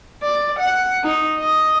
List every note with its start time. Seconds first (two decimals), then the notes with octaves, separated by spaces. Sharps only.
0.23 D5
0.59 F#5
1.04 D#4
1.39 D#5